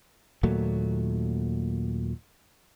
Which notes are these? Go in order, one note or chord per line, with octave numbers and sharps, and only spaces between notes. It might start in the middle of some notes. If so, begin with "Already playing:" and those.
D#2 A#2 F#3 A3